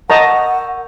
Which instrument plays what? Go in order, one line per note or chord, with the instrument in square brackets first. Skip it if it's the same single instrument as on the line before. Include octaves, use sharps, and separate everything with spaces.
[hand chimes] A#4 C#6 G6 [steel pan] D#5 A5 A#5 [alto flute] F#5